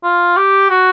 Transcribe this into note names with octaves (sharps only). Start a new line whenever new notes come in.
F4
G4
F#4